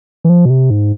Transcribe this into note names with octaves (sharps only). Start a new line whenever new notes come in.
E3
F3
B2
C3
G#2